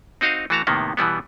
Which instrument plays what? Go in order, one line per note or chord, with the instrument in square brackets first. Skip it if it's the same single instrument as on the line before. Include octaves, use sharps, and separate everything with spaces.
[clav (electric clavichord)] C4 D#4 F#4 D#5 F5
E3 A3 F#4 A5 A#5
A2 C3 D#3 A#3 B3
B2 E3 G3 B3